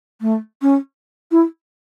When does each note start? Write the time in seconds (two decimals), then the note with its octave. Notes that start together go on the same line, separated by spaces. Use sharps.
0.21 A3
0.62 C#4
1.31 E4